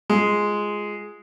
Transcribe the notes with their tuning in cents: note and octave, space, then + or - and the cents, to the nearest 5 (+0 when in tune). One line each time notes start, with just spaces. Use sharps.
G#3 +5 F4 +0